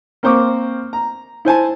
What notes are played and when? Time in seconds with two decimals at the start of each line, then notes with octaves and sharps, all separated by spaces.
0.23 A#3 C4 C5 C#6 D6
0.93 A#5
1.45 E4 C5 G#5 A5